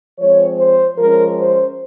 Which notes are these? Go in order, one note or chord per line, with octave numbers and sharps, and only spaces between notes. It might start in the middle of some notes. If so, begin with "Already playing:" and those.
F3 G#3 C4 C#5
C5
F3 G#3 C#4 A#4
C5